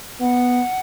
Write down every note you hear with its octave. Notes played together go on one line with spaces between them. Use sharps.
B3 F#5